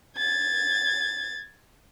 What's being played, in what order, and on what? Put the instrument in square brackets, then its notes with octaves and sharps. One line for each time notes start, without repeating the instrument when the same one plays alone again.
[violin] G#6 A6